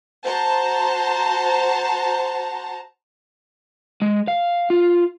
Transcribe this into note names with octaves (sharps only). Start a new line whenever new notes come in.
F#4 C5 A5 A#5
G#3
F5
F4